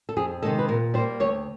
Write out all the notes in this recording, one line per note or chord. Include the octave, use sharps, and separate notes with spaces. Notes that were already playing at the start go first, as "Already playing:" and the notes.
A4
F2 G#4
C3 D#3 G#3 A4
B4
A#2 A#4
G3 A#3 C5
D2 C#5